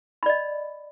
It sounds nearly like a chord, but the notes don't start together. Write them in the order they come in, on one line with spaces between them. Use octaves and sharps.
B5 D5 D#5